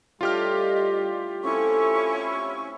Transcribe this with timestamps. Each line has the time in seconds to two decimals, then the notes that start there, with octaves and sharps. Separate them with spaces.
0.21 A2 G3 D4 F4 G4 D#5 F6
1.43 A3 C4 C#4 E4 A4 C#6